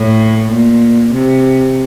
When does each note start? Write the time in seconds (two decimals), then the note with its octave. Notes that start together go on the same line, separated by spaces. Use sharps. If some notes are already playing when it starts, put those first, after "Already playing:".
Already playing: A2
0.53 A#2
1.13 C3